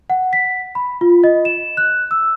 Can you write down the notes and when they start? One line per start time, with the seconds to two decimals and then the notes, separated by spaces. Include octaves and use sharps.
0.10 F#5
0.33 B6
0.75 B5
1.01 F4
1.24 D#5
1.45 E7
1.77 F#6
2.11 E6